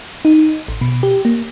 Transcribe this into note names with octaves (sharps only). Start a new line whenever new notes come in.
D#4
A1
B2
G4
A#3